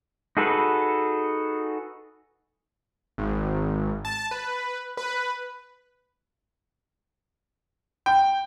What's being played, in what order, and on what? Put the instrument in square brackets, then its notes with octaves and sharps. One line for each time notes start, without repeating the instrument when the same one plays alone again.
[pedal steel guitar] D#4 F#4 G#4 A4 B4
[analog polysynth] G#1
A5
B4
B4
[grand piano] G5